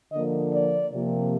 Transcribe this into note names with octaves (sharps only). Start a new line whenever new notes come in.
D3 F3 A#3 D#5
D5
C3 F3 A#3